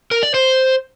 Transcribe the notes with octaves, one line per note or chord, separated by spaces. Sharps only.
A#4
D5
C5